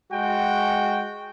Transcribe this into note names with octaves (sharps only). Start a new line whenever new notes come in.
G#3 F#4 G5